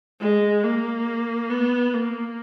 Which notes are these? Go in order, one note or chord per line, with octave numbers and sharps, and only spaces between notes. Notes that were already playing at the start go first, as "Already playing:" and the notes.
G#3
A#3
B3
A#3